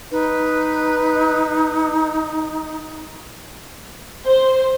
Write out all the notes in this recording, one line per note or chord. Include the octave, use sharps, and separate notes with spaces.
D#4 B4
C5